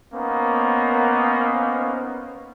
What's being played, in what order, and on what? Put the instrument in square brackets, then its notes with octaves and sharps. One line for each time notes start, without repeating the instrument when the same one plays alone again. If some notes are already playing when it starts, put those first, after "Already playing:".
[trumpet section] A#3 B3 C#4 D#4 C5